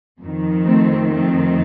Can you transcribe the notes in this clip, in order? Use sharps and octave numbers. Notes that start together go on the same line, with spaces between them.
F2 D#3
A3 C4
A3 C4